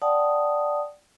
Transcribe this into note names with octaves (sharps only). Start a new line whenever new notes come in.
D5 F#5 G5 A5 D#6